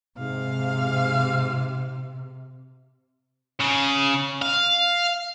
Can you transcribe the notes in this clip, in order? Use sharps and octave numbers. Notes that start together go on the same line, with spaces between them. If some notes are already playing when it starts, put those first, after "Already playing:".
G#2 C3 F5
C#3
F5